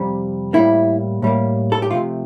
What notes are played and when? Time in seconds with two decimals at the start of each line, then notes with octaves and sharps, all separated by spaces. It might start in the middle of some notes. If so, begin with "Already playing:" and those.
Already playing: F2 C3 G3
0.53 A2 G3 A#3 E4
1.22 A2 G3 A#3
1.72 A4
1.82 G4
1.91 C3 F3 A3 F4